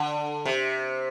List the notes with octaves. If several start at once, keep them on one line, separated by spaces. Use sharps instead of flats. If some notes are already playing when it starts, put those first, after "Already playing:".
Already playing: D3
C3